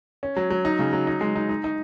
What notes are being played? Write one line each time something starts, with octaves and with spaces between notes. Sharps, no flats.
C#4
F#3
F#3
D#4
C#3
F#3
D#4
G#3
D#4
D#4
D#4